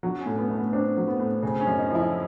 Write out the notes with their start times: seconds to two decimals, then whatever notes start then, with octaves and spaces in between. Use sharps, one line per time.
0.03 F#3 D4
0.20 C#4
0.26 A2
0.38 B3
0.50 A3
0.56 B3
0.73 C4 D4
0.97 F#3
1.07 B3
1.19 A2
1.42 C#3 C4
1.60 C#4
1.67 F#2
1.78 D#4
1.90 F3 E4